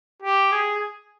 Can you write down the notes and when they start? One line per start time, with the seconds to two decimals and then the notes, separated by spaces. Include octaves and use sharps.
0.22 G4
0.52 G#4